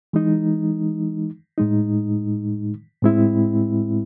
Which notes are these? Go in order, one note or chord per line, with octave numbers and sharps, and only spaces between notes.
E3 G#3 D#4
A2 G#3 D#4
A2 G#3 C4 E4